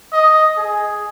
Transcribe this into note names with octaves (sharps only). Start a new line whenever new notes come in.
D#5
G#4